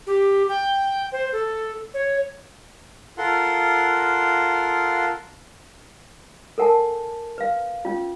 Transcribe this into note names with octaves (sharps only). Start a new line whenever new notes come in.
G4
G5
C5
A4
C#5
F4 A4 A#4 F#5 C6
A4 A#4 F#5 G#5 A5
B4 F5
C#4 F4